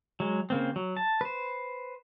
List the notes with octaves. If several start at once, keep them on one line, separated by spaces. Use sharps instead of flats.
F#3 G#3
C#3 A#3 C4
F#3
A5
B4 C5